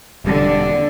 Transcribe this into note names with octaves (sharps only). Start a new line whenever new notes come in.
E1 D3 G3